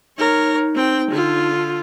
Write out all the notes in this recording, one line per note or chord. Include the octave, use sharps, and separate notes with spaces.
D#4 A#4 C#5
C4 G5
D3 F4